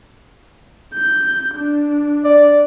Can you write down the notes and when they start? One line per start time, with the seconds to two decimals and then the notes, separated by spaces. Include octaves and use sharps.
0.94 G6
1.55 D4
2.24 D5